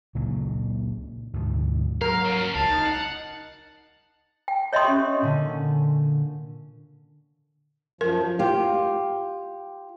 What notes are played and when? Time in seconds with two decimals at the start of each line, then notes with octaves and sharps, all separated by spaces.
0.15 C#2 A#2 C#3 F#3
1.33 D2 G#2 B2
2.02 F#3 A#4 F5
2.25 A#3 C#4
2.55 C#2 F5 A5
2.70 D#4
2.86 F#5
4.48 G5
4.73 C#5 D#5 E5 G5 C6 D#6
4.85 C#4 G4
5.22 A#2 D3 C#4
8.01 F#2 F3 A#4
8.39 F4 G4